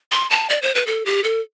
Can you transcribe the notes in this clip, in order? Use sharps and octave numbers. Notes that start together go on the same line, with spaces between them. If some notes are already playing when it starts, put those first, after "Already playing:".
C6
A5
D5
C5
B4
A4
G4
A4